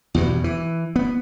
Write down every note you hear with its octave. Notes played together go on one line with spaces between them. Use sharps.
E2 G2 B2
E3
B3